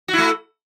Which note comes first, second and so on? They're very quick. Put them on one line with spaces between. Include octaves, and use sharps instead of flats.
F#4 E4 A3